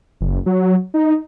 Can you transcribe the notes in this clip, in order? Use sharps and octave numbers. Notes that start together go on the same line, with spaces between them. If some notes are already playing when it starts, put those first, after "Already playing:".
F#1
F#3
D#4